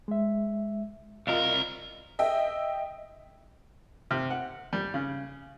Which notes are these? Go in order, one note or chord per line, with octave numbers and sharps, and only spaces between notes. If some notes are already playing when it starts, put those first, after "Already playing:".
G#3 E5
C2 F4 A#4 D#5 F5
D#5 E5 G5
C3
F#5
G3
C#3